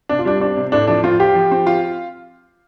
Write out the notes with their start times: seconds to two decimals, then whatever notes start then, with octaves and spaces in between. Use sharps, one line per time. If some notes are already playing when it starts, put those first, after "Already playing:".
0.09 C3 D4
0.19 F4
0.25 G3 D4
0.41 C4 D4
0.57 C3
0.72 A2 D4
0.88 F3 D4
1.04 C4 F4
1.20 F4 G4
1.35 F3
1.51 C4
1.67 F4